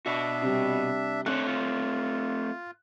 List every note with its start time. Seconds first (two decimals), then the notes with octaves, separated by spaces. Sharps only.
0.06 B2 D4 F#4 E5
0.42 C3 G3
1.26 A3 C4 D4 C#5 F#6
1.46 F4